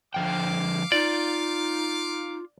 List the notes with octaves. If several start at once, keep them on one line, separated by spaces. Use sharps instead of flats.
D3 F3 F5 G5 D6
D#4 F4 D5